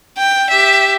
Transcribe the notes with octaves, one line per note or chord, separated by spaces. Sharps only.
G5
G4 E5